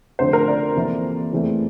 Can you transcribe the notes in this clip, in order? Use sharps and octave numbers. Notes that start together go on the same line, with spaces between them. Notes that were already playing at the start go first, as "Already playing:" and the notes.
F2 D3 A3 C4 C5
A#4
D5
F2 E3 A#3
E2 E3 A3 C4